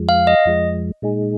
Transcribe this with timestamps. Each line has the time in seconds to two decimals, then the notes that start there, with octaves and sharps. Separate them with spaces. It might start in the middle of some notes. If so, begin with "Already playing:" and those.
Already playing: F2 F3 G#3
0.09 F5
0.27 D#5
0.45 F2 F3 G#3
1.02 A#2 G#3 D#4 G#4